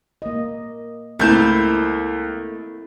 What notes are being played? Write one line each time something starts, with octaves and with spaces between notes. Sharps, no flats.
A#3 D#5
C#2 A3 A#3 C4 E4 G6 E7